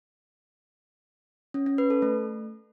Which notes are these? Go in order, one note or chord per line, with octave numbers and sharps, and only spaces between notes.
C#4
C#4
B4
A4
A3